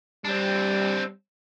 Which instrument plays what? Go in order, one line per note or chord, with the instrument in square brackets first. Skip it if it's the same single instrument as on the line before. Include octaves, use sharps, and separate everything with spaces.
[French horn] G3 [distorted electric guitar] C4 D4